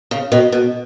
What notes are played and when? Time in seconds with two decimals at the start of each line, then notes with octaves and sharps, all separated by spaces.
0.11 C#3
0.32 B2 D#3
0.52 B2